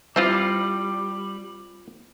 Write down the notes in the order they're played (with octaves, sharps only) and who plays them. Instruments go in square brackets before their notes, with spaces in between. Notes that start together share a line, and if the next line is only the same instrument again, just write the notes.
[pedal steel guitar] G3 [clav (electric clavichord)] C4 F4 [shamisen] E4 C5 E5 [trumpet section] B5 D6